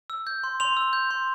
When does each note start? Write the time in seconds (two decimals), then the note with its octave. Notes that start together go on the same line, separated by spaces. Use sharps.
0.10 E6
0.27 G6
0.44 C6
0.60 C6 F7
0.77 E6
0.93 G6
1.11 C6